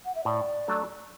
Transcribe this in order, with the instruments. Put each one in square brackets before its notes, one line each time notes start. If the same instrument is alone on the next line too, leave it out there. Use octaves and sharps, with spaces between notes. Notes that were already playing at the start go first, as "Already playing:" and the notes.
[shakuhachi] F#5
E5
[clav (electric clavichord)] A2 [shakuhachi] D5
[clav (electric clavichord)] F#3 A3 D4 A4